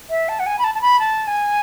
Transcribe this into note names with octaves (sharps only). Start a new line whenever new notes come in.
E5
A5
F#5
G#5
B5
A5
A5
B5
A5
G#5